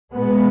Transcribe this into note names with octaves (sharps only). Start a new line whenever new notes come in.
B2 G#3 B3